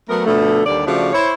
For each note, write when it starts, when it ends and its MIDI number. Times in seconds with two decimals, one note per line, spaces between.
0.09 0.22 54
0.09 0.22 57
0.09 0.22 59
0.09 0.22 70
0.26 0.61 47
0.26 0.61 50
0.26 0.61 53
0.26 0.61 57
0.66 0.83 39
0.66 0.83 50
0.66 0.83 55
0.66 0.83 74
0.86 1.08 49
0.86 1.08 53
0.86 1.08 57
0.86 1.08 62
0.86 1.08 66
0.86 1.08 74
1.13 1.33 64
1.13 1.33 72
1.13 1.33 73